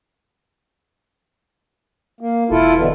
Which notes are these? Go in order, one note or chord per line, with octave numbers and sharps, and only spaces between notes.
A#3
E1 E4 F4 A4
B2 D3 E3